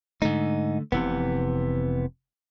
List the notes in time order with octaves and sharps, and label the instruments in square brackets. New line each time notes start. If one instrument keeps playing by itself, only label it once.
[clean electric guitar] G#2 D#4 [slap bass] D3 A3
[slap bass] F1 [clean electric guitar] C3 E3 B3